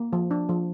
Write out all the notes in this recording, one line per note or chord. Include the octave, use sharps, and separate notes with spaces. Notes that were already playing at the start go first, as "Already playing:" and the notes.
Already playing: A#3
F3
D4
F3